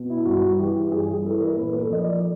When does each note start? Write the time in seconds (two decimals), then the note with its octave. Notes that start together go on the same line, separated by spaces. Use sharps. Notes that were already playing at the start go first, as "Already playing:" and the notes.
Already playing: B2
0.10 E4
0.25 G2 F#4
0.59 E3 G4
0.91 G2 G#4
1.08 G#4
1.24 E3 A4
1.40 A#4
1.57 A#2 B4
1.74 A#4
1.79 A4
1.89 F3 D#5
2.01 D5